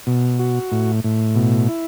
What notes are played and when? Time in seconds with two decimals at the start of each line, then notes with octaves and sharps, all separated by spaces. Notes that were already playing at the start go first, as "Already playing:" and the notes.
0.07 B2
0.39 F#4
0.72 A2
1.04 A2
1.35 B2
1.69 E4